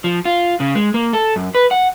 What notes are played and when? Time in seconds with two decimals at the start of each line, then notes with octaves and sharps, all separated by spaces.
0.04 F3
0.25 F4
0.60 C#3
0.75 G#3
0.94 A#3
1.13 A4
1.36 F#2
1.55 B4
1.71 F#5